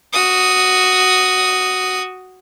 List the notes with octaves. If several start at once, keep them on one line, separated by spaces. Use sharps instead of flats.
F#4 D#6